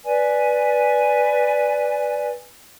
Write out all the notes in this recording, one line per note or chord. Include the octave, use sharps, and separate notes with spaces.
B4 D5 G#5